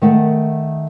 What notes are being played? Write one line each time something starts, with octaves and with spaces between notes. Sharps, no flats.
D#3 A3 F#5